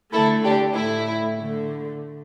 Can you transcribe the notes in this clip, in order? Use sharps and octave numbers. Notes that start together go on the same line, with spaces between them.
D3 A3 E4 A4
D4 G4
A2 A3 E4
D3 A3